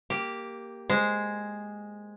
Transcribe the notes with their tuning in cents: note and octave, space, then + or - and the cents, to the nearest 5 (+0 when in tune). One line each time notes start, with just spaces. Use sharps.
A#3 +0 G4 +0
G#3 +0 C5 +0